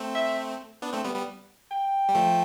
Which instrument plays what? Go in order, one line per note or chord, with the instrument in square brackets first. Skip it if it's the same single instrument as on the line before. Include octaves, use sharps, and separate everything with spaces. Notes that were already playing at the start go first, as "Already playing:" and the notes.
Already playing: [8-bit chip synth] A3 C4
[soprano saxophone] E5
[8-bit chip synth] B3 D4
A3 C4
G3 B3
G3 B3
[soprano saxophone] G5
[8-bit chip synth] G3
F3 A3